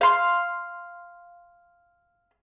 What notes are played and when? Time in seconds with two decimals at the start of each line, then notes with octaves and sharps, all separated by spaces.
0.01 F5 C6